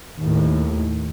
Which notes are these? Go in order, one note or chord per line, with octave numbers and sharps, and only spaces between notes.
D#2 A2